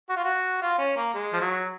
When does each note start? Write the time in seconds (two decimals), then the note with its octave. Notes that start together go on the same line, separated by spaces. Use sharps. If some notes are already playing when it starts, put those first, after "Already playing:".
0.10 F#4
0.16 F4
0.24 F#4
0.62 F4
0.79 C#4
0.96 A#3
1.14 G#3
1.33 F3
1.40 F#3